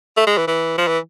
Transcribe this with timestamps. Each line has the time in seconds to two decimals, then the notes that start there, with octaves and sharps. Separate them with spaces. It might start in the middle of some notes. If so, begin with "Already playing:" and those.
0.17 A3
0.27 G#3
0.37 E3
0.47 E3
0.78 F3
0.87 E3